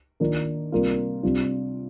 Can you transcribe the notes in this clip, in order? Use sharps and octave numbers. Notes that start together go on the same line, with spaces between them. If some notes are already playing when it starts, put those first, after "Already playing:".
D#3 A#3 D4 F4
C3 G3 A#3 D4 F4
C3 G3 D4 F4